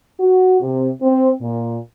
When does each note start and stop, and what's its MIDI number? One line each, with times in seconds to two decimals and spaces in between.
0.20 0.57 66
0.61 0.89 48
1.02 1.30 60
1.42 1.77 46